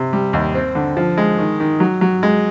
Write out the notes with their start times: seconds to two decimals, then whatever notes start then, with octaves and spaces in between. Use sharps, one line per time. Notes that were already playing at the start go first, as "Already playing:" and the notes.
Already playing: C3
0.13 G3
0.33 D#2
0.55 C4
0.75 D3
0.97 F3
1.18 G#3
1.39 D#3
1.60 D#3
1.80 F#3
2.01 F#3
2.23 G#3